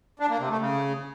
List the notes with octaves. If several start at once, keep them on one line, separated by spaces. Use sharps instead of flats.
D4
A#3
C3
A3
C#3